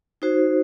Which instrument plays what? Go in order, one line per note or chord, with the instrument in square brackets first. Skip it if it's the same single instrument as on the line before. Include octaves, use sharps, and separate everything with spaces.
[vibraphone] D#4 F#4 C5